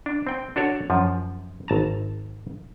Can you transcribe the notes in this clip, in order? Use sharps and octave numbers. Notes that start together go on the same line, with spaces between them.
D4
C4 G5
D4 F#4 A4 C#5
F#2 F3
G#1 A5 A#5